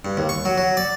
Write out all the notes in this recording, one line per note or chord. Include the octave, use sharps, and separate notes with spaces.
G2
D#2
C#6
F#3
F#3
D5